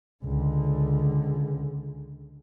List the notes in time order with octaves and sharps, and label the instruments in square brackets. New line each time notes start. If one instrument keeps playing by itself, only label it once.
[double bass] C#2 D3